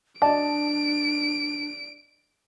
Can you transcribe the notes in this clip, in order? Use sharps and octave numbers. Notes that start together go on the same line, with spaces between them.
D4 D5 D#5 A5 D7